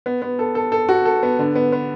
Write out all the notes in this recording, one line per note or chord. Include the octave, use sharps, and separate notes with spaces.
B3
B3
A4
A4
A4
F#4
A4
B3
D3
B3
B3